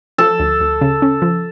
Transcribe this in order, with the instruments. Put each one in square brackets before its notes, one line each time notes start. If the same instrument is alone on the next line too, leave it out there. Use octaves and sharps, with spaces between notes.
[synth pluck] F3 [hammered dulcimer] A4
[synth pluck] D2
D2
C#3
C#4
F3